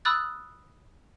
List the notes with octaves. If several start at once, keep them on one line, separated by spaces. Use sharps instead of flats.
B5 D#6 E6 F#6 A6